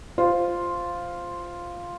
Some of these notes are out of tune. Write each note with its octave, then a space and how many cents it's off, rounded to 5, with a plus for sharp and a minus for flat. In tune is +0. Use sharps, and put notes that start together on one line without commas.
F4 +0 C5 -5